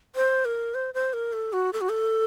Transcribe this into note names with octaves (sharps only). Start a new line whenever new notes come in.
C5
A#4
C5
C5
A#4
A4
F#4
A4
F#4
A4